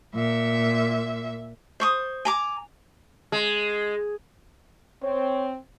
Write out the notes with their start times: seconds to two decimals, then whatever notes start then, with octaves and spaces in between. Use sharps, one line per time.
0.14 A#2 E5
1.80 C5 C#6 D#6
2.25 G#5 A#5 D6
3.32 G#3
5.03 C4 C#5